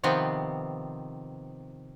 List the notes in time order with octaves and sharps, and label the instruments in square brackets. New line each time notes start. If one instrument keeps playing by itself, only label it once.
[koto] C3 D#3 F3 B3 C4